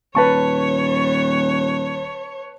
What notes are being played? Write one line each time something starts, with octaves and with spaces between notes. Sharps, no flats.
D#1 B4 C#5 A5 C#6